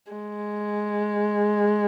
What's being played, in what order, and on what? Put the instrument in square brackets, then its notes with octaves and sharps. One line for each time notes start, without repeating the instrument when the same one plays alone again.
[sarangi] G#3